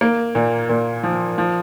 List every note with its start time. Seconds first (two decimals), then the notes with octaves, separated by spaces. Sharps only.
0.01 A#3
0.35 A#2
0.69 A#2
1.03 F3
1.38 F3